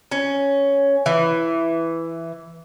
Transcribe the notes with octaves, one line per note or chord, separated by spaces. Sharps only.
C#4
E3